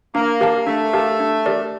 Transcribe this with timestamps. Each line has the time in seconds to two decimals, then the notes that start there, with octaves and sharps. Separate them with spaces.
0.15 A#3 D4
0.41 G4 A#4 F5 A5
0.67 A3 D4
0.93 G4 A#4 F5 A5
1.20 D4
1.46 G4 A#4 D5